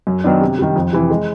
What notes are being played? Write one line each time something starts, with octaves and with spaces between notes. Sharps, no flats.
F#2
D#3 F#3 B3 D4
C3
D#3 G3
F2
C3 E3
G#3